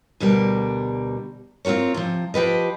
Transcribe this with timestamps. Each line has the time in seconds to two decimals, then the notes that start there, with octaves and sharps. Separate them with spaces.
0.20 D2 B2 D3 G3 A#4
1.65 C4 F4 F#4 A#4 C#5
1.94 C3 F3
2.34 F3 G4 B4 D#5